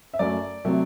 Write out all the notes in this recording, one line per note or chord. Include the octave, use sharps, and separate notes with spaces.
E5
F#2 F#3 A3 D5
C3 F#3 A3